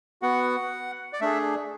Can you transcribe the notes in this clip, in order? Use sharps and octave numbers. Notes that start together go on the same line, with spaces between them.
B3 F#4 F#5
D5
A3 D4 G#4 E5